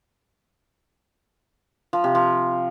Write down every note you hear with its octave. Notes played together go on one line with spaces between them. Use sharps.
F3
C3
F3